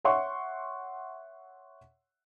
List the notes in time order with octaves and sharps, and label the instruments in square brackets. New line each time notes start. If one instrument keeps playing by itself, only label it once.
[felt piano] C#5 E5 F#5 C6 C#6